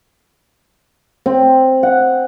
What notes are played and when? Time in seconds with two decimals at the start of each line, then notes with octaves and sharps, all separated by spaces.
1.26 C4
1.83 F#5